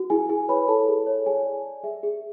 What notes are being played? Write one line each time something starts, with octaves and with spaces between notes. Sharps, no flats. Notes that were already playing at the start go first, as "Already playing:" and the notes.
Already playing: F#4
E4 G#4 G#5
E4 G#4 G#5
B4 C#5 B5
E4 A4 A5
G#4
C#5
G#4 G#5
D5
D5
G#4 E5
G#4